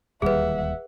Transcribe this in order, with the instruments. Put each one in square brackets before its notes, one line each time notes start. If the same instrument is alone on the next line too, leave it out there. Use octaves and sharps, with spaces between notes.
[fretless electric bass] D1 D#2 G3 [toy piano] G#4 B4 [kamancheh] E5 F#5